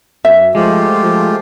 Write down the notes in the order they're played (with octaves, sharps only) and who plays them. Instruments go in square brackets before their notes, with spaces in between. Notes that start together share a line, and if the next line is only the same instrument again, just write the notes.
[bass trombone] F#2 [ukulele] E5
[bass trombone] F3 [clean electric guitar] G#3 [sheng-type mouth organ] A3 F4 G4
[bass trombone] F3